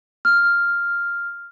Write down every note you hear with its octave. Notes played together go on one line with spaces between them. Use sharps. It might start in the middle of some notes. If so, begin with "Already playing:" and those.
F6